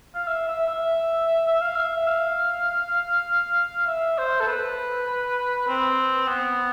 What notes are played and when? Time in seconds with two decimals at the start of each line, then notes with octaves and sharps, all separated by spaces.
0.15 F5
0.28 E5
0.48 E5
0.67 E5
1.48 E5
1.62 F5
1.76 E5
2.07 F5
3.87 E5
4.18 C5
4.41 A4
4.47 B4
5.68 C4
6.28 B3